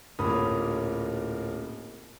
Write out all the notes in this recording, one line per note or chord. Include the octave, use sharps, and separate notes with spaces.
D1 A#2 A#3 C#4 B5 D#6